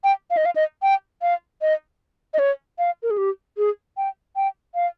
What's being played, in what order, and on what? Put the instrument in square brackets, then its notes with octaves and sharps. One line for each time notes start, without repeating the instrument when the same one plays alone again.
[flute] G5
F5
D#5
F5
D#5
G5
F5
D#5
D#5
C#5
F5
A#4
G#4
G4
G#4
G5
G5
F5